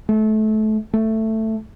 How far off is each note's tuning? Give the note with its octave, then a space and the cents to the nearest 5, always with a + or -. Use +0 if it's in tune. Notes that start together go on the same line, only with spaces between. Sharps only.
A3 -25
A3 +10